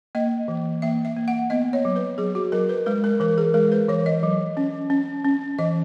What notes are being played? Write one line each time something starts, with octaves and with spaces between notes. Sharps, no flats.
A#3 D#5
E3
A#3 E5
E5
A#3
F#5
B3 D#5
C#5
F#3
B4
F#3 G#4
F#4
F#3 A#4
B4
G#3 B4
A#4
E3 A#4
G#4
G#3 A#4
B4
E3 C#5
D#5
F#3
C#4
C#4
C#4
E3 D#5